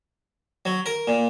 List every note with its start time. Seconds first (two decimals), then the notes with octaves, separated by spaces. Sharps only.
0.65 F#3
0.86 A#4
1.07 A#2